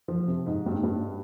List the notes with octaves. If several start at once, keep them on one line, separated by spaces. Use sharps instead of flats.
F3
C3
G#2
G2
G#2
G2